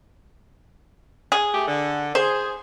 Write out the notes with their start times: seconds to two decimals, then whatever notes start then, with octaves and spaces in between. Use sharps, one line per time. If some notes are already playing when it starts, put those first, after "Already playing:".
1.32 G#4
1.54 A3 G4
1.68 D3
2.15 G#4 C5